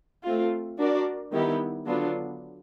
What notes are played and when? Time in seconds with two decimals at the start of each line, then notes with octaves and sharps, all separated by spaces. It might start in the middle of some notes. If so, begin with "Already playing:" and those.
0.24 A3 C4 F4
0.78 D4 F#4 A#4 D5
1.32 D#3 G3 B3 E4 G4
1.86 D3 F#3 B3 D4 F4